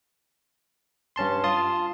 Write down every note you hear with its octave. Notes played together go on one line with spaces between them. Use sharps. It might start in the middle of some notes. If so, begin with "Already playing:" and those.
G2 C#4 A5 C6
F4 A5 C6 D#6